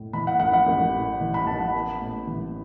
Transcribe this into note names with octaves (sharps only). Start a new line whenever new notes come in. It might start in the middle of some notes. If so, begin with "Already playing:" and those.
Already playing: A2
E3 B5
F#5
A1 F#5
F#5
A1
A2
E3
B5
A1 A5
F#5
B3
A2
E3